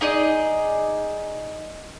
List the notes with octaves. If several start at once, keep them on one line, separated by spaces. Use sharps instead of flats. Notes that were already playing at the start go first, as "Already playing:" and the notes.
D#4 G#4 D5 D#5